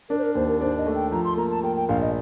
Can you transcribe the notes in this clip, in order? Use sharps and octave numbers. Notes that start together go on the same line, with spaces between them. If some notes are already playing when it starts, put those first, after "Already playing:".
D4 A#4
C5
A#4
D#2 C5
A#4
D4 C5
D#5
A3
G5
F3 A#5
C6
A#3 A#5
A5
A#3 G5
G5
A#1 F5
D#5